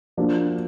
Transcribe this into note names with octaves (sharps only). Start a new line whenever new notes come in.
F3 A#3 D4 F#4